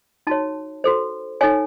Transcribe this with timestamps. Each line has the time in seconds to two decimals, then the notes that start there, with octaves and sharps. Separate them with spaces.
0.27 D#4 F#4 C#5 A5
0.84 F#4 A4 C5
1.41 D#4 A4 C#5 G#5